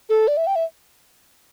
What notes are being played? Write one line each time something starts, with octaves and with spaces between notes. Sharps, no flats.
A4
D5
E5
G5
E5